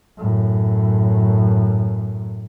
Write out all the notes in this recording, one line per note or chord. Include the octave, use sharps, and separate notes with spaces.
F#2 A2